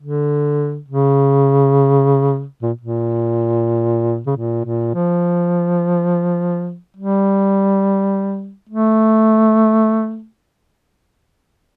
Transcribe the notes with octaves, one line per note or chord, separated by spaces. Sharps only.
D3
C#3
A#2
A#2
C#3
A#2
A#2
F3
G3
A3